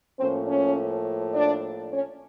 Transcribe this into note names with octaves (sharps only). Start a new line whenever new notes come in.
A2 F3 A#3 C4 C#4 C5
C#4 C#5
D4 D5
C#4 C#5